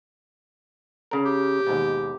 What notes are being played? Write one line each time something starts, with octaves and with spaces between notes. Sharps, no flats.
C#3 A#4
G4
D#2 G#2 B2